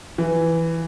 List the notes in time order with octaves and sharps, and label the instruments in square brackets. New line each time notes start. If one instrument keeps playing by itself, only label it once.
[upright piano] E3